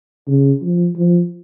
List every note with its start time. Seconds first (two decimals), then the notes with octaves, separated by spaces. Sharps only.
0.28 C#3
0.62 F3
0.95 F3